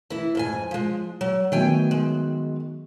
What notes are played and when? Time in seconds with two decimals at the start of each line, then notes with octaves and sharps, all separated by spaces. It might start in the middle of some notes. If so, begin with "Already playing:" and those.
0.10 E3 E4
0.35 F2 G#2 G#5
0.71 F3 G#3
1.21 F#3
1.52 D#3 F#3 A3 B3 G5 G#5
1.91 G#3